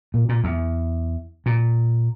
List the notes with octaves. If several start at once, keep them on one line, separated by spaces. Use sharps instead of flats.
A#2
A#2
E2
A#2